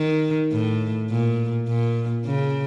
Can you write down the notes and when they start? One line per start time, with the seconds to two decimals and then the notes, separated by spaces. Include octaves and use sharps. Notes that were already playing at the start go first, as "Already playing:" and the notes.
Already playing: D#3
0.52 A2
1.10 A#2
1.68 A#2
2.26 C#3